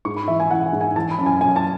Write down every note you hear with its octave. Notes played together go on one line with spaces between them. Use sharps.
G#2 C#6
B5
E3 E5
G#5
E3 F#5
G#5
G#2
G#5
E3 A5
B5
F#2
G#5
F#2 G#5
A5